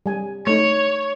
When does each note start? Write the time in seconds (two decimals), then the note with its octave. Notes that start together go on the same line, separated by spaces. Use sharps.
0.06 G3 G#5
0.47 A3 D#4 C#5